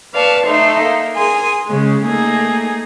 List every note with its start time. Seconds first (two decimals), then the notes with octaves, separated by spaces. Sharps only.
0.14 B4 D5 F5 A5 C#6
0.46 A3 D#4 A4 C5 E5
0.84 A#3
1.15 G#4 A#4 G#5 C6
1.68 C#3 G#3
2.05 A3 A#3 D#4 G#4